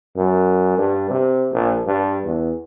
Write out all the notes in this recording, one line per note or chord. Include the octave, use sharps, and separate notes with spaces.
F#2
G2
C3
A#1
G2
E2